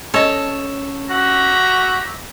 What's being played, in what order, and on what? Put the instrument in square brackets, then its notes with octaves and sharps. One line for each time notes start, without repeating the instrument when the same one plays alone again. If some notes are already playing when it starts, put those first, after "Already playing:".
[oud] C#4 D#5 [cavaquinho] A4 C#5
[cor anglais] F#4 [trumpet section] G4 E5 A#5